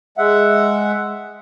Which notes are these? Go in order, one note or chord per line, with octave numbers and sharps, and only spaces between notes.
G#3 E5 F#5